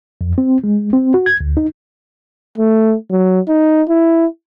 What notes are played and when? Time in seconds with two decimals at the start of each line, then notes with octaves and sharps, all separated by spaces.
0.21 F2
0.38 C4
0.64 G#3
0.93 C4
1.14 F#4
1.26 G#6
1.41 D2
1.57 D#4
2.58 A3
3.11 F#3
3.49 D#4
3.89 E4